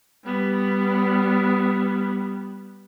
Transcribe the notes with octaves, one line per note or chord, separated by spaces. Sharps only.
G3 B3